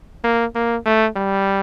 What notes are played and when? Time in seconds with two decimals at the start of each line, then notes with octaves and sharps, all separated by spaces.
0.24 A#3
0.55 A#3
0.86 A3
1.16 G3